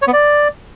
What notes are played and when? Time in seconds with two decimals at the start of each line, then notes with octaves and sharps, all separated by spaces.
0.02 C#5
0.07 B3
0.13 D5